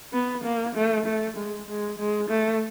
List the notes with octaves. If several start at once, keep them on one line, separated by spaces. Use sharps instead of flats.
B3
A#3
A3
A3
G#3
G#3
G#3
A3